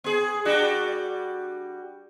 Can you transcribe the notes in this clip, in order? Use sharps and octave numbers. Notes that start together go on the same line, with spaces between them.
B3 G#4
G3 D4 F#4